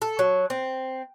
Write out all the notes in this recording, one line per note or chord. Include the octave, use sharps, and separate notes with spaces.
A4
F#3
C4